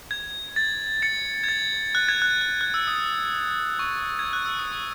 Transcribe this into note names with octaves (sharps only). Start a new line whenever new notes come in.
G#6
A6
A6 C#7
G#6
A6
F#6
G#6
F#6
F#6
F#6
E6
D#6
C#6
G#6
F#6
E6
D#6
C#6